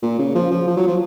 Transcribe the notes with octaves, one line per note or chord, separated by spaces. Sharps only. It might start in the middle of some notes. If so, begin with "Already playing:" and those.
A#2
C#3
F3
F3
F3
F#3
F3